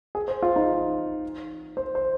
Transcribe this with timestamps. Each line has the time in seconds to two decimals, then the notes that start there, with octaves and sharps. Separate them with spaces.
0.15 G#4
0.28 C5
0.43 F4
0.56 D#4
1.77 C5
1.95 C5